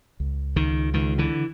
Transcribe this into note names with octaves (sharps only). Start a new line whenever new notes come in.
C#2
C#2 D#3
C#2 D#3
D3 E3